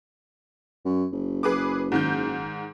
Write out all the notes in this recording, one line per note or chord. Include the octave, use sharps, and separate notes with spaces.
F#2
F#1
G#4 B4 D6
G#2 D#3 G6